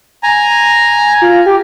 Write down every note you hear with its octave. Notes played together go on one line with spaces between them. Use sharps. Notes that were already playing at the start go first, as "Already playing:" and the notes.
G#5 A#5
F4
G4